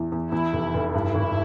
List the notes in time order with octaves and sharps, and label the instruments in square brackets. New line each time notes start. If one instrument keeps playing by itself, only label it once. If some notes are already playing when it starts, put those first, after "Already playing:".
Already playing: [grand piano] E2 E3
E2
[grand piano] E2 [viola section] E4
[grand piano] F1
F1
[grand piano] G2 [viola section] E4
[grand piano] G#1